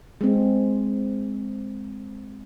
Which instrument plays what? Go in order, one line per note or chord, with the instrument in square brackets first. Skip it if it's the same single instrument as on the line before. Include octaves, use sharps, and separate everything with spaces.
[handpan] G#3 C4